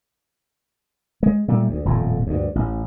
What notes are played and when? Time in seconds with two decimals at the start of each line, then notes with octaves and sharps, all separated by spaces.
1.23 G#3
1.48 A#2 G3 A3
1.70 D2
1.85 D#1 F2 A2
2.27 D2 G2
2.55 A1